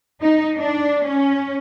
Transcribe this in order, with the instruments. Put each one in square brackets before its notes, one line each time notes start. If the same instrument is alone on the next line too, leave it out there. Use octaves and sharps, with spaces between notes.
[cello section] D#4
D4
C#4